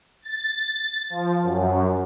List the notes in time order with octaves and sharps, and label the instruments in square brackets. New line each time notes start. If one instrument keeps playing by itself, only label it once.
[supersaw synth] A6
F3
F#2